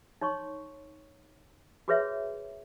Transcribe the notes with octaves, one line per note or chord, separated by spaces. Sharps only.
D#4 C#5 C6 C#6
F#4 G#4 B4 C#5 E5